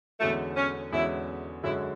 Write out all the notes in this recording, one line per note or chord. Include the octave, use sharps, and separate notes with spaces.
E2 D3 G#3 A3 C#4 F#4
C#4
E2 D3 G#3 C#4 E4 F#4
F#2 D3 G#3 C#4 E4 F#4